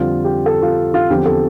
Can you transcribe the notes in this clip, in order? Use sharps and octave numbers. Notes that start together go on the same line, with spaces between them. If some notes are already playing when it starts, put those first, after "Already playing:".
Already playing: F2 D3 G3 C4 F4
G4
A4
F4
F4
E2 D3 F3 C4 G4
A4